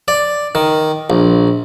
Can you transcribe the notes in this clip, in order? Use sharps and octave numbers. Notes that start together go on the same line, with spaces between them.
D5
D#3
A#1